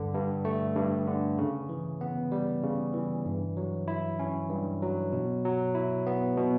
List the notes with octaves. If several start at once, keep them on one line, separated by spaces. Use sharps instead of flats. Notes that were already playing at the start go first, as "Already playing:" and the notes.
Already playing: G2 D3
G2
A3
G2
D3
C#3
E3
B3
G3
C#3
E3
G2
F#3
E4
C#4
G2
F#3
B2
F#3
E4
B3
B2